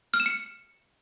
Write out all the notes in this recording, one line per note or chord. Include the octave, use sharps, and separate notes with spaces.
F6
E7
C#7